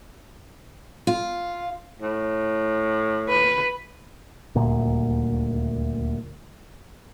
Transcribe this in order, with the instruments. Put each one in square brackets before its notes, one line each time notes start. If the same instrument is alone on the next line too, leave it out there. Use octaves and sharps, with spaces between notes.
[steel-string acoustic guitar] F4
[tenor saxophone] A2
[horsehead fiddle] B4
[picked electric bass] D#1 D2 A#2